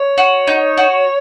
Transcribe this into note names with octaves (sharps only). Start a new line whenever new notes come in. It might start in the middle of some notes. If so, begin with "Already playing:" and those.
Already playing: C#5
F#4
D#4
F#4